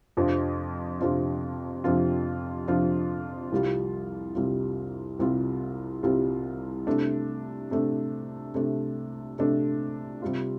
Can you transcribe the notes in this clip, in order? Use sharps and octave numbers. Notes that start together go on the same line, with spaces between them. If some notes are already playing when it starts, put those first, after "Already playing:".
F2 C3 F3 D4 F4
F2 C3 F3 D4 F4
F2 C3 F3 D4 F4
F2 C3 F3 D4 F4
C2 C3 G3 F4
C2 C3 G3 F4
C2 C3 G3 F4
C2 C3 G3 F4
C3 A3 D4
C3 A3 D4
C3 A3 D4
C3 A3 D4
C3 G3 F4